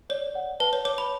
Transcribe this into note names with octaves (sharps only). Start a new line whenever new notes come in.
C#5 D5
F#5
B4 A5
C#5
C#5 D6
B5